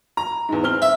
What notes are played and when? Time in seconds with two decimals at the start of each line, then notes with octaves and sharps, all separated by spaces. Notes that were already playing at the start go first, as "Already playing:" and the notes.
0.17 A#5
0.49 E2 G#2
0.63 C4 F6 G7
0.82 E5